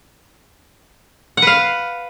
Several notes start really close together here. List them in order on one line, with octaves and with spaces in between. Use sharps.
F#5 B4 F5